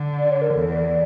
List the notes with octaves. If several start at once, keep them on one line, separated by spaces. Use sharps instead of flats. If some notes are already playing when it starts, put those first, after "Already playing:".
Already playing: D3
D5
C#5
A#4
E2 A4
D5